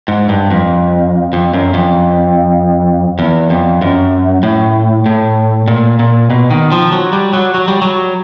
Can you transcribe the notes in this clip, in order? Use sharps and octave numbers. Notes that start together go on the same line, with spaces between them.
G#2
G2
F2
F2
F#2
F2
E2
F2
F#2
A2
A2
A#2
A#2
B2
D#3
F3
F#3
G3
F#3
F#3
G3
F#3